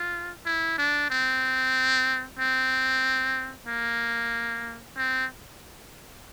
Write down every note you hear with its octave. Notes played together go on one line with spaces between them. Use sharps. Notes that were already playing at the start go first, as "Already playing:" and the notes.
Already playing: F4
E4
D4
C4
C4
A#3
C4